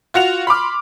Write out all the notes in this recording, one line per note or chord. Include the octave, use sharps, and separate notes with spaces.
F4 F#4 F#5 F7
B5 C6 D6 F6